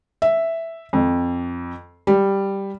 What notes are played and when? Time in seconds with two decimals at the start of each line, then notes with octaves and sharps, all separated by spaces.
0.22 E5
0.93 F2
2.07 G3